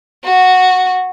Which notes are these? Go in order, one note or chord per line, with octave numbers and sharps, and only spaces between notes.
F#4